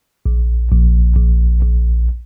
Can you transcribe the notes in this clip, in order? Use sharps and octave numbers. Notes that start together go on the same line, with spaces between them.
A#1
A#1
A#1
A#1